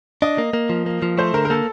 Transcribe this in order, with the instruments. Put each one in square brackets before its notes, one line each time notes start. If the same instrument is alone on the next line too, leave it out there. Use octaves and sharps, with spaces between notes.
[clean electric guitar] D4 [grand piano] D#5
[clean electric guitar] A#3
A#3
F3
A#3
F3
[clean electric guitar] A3 [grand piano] C5
[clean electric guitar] D3 [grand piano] A#4
[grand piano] A#4
[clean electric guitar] A#3 [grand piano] A4